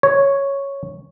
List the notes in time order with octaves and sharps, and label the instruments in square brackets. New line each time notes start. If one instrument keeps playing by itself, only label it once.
[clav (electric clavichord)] C#5